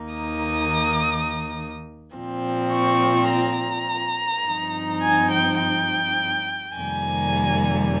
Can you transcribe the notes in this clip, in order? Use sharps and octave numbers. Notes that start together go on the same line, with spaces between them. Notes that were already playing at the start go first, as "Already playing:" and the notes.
Already playing: D#2 D#3 A#3 D#4
D#6
A#2 F3 C4
C#6
A#5
G2 F3 C4 D#4
G#5
G5
G5
F2 C3 D#3 G3 A#3 G#5